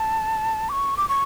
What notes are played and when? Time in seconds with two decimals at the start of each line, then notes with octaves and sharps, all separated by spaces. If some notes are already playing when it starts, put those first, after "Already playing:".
Already playing: A5
0.69 D6
0.72 C#6
0.97 D6
1.09 C#6